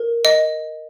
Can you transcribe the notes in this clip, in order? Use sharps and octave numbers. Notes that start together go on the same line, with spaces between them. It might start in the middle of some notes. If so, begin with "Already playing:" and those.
Already playing: A#4
D#5